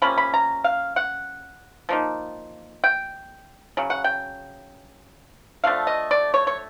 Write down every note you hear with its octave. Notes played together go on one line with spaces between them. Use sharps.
C3 F3 A#3 C#4 B5
B5
A#5
F5
F#5
F3 A#3 D#4
G5
C#3 F#3
F#5
G5
D3 F3 A3 D4 F5
D#5
D5
C#5
C#5